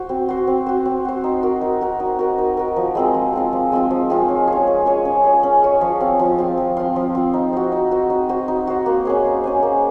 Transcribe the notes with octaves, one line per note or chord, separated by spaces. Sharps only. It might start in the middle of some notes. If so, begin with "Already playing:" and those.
Already playing: F#4 C5
C4
F#4 C5
C4
F#4 C5
C4
F#4 C5
D#4
F#4 A#4
D#4
F#4 A#4
D#4
F#4 A#4
D#4
F#4 A#4
F3
G#3 C4 F4
F3
G#3 C4 F4
F3
G#3 C4 F4
F3
G#3 C4 F4
C#4
G#4 C#5
C#4
G#4 C#5
C#4
G#4 C#5
C#4
G#4 C#5
F3
C4 F4
F3
C4 F4
F3
C4 F4
F3
C4 F4
D#4
F#4 C5
D#4
F#4 C5
D#4
F#4 C5
D#4
F#4 C5
A#3
C#4 G#4 C5
A#3
C#4 G#4 C5
A#3